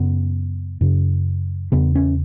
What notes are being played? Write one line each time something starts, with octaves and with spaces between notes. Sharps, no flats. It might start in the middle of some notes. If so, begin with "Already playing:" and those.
Already playing: F#2 C#3 B3
F#2 C#3
E2 C#3 B3
C#4